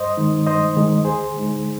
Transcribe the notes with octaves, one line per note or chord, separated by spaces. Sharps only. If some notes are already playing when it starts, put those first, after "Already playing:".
Already playing: G2 C5 D#5
D#3 G#3 D#4
G2 C5 D#5
D#3 G#3 D#4
D2 G#4 C5
D3 G#3 D#4